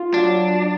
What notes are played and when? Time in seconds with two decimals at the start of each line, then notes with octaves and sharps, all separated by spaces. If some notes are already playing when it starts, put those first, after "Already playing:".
Already playing: F4
0.13 F#3 D4